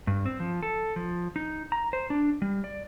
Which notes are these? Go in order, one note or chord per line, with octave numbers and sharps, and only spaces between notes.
G2
C4
F3
A4
F3
D#4
A#5
C5
D4
G3
D5